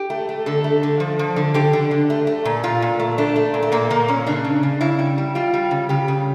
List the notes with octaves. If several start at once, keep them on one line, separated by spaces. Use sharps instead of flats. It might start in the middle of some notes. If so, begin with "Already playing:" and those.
Already playing: G4
A3
A3
D3 A4
A3
D3
F3
F3
D3
D3 G4
D3
D3
A3
A3
A#2
A#2 F4
A#2
A3
A3 D4
A3
A#2
A3
A#2 A#3
A#2 A#3
A#2 C#4
C#3 D4
C#3
C#3
C#3 E4
G3
G3
G3 F4
G3
C#3
C#3 G4
C#3